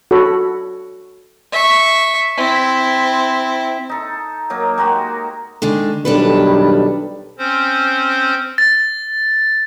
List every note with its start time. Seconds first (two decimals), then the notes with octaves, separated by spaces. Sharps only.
0.11 F#4 A4 C#5 B5
1.52 E5 C#6
2.37 C4 E4
3.89 D#4 A4
4.50 F#3 A#3 D#4
4.78 G#3 A#3 F#4 G4
5.62 D3 D#3 G#3
6.05 B1 D#3 G3 D4 A4 B4
7.38 C4 C#4 C5
8.58 A6